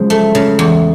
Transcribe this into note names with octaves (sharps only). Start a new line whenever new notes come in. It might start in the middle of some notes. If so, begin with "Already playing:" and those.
Already playing: C#3 F3 F#3 G#3
A3
C#3
E2